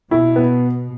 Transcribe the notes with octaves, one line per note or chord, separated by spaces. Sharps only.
B2 E4
B3